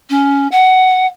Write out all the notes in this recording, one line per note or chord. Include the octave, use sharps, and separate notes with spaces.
C#4
F#5